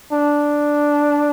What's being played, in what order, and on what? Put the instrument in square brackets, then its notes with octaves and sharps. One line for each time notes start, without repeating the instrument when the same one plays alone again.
[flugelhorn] D4